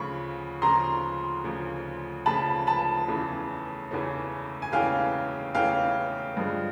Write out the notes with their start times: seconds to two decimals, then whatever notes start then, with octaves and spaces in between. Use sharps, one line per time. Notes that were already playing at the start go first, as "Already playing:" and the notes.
Already playing: D2 C#3 F3 B5 C#6
0.62 D2 C#3 F3 A#5 C6
1.44 D2 C#3 F3
2.26 D2 C#3 F3 A5 B5
2.67 A5 B5
3.08 E2 C#3 E3 A3 C#4
3.91 E2 C#3 E3 A3 C#4
4.62 G#5
4.72 E2 C#3 E3 A3 C#4 F5 G5
5.55 E2 C#3 E3 A3 C#4 F5 G5
6.37 G2 D3 F3 G#3